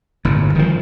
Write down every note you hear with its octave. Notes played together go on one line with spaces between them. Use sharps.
G1 A2
D#3 F3